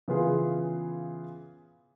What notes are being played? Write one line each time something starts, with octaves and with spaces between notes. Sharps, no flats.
C#3 E3 B3 F4 G#4